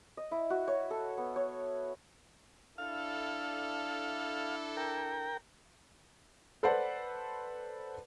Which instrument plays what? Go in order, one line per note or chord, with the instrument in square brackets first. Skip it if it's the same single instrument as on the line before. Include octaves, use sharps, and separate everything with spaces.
[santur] D#5
E4
F#4
C#5
A4
B3
C#5
[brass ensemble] D4 E4 A4 [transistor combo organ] F5
[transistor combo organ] A#4 G5
[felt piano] A4 B4 C5 D5 F#5